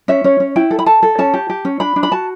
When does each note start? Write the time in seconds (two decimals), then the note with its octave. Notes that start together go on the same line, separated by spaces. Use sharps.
0.08 C#4 E5
0.24 C#4 C#5
0.40 C#4
0.56 E4 G5
0.71 A4
0.79 B5
0.86 A4 A5
1.03 A4
1.18 C#4 A5
1.34 G4
1.50 G4
1.65 C#4
1.80 D4 B5
1.96 D4
2.03 B5
2.12 F#4 A5